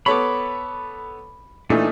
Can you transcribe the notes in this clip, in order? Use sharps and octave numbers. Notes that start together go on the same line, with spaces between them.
B3 A4 C#5 B5 D6
A#2 E3 A3 D4 D#4